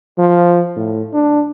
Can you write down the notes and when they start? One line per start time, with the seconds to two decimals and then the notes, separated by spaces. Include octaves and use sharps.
0.18 F3
0.76 A2
1.13 D4